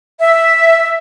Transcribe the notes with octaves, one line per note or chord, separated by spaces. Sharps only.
E5